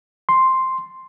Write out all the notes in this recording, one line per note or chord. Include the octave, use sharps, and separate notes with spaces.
C6